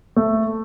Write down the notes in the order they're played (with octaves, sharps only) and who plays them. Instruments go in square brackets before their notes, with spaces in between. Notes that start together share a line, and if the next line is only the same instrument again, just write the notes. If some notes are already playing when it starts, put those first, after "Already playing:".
[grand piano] A3